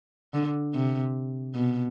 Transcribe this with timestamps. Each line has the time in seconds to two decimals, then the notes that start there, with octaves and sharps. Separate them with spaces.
0.34 D3
0.74 C3
1.55 B2